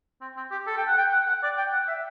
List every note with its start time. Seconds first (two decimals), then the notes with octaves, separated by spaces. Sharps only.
0.21 C4
0.37 C4
0.51 G4
0.67 A4
0.77 G5
0.88 F#5
0.98 G5
1.12 F#5
1.28 F#5
1.43 D5
1.58 G5
1.72 F#5
1.88 E5